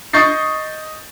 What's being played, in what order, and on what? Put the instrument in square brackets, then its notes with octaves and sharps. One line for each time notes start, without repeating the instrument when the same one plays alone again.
[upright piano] D#5 C#6 G6 A6 C7